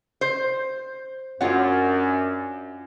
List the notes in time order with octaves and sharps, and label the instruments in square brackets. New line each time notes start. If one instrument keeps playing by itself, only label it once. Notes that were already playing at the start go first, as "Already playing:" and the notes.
[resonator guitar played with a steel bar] C5
[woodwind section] F#2 [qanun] C#4 F4 F#4 [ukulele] D4 C#5 F#5